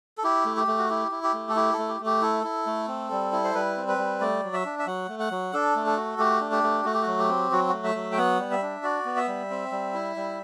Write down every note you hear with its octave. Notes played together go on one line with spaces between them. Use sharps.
A4
E4 G4
A3
G4
A3
F#4
E4 G4
E4
G4
A3
A4
E4 G4
A4
A3
G4
A3
G4
E4 A4
E4
A3
C4
G3
E4
C5
G3 B4
C4
B4
G3
A3 D5
F#3
E5
D4
E5
F#3 F#5
A3
F#5
F#3
D4 A4
A3
A4
F#4
A3 G4
D4
G4
A3
A3 F#4
G4
F#3 F#4
G4
C4
F#3 F#4
A3 F#4
E5
F#3
G5
B3 F#5
G3
E5
D4
F#4 D5
B3
E5
G3
C4
G3
E4
G3